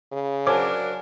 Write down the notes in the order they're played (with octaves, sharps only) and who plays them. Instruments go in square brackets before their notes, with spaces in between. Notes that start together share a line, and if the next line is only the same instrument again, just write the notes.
[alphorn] C#3
[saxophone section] F#3 D4 A#4 [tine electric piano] C5 G#5 A5 [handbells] C#5 D6